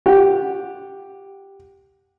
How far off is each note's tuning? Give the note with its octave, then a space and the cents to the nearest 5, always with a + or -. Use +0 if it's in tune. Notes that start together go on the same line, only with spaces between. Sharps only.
G4 +0 F#5 -15